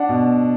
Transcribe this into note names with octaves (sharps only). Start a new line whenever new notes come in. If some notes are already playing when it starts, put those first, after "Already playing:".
Already playing: D4 F#5
B2